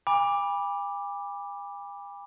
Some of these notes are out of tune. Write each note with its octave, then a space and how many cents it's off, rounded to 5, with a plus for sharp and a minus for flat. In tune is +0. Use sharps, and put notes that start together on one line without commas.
G#5 -45 B5 -15 D6 +0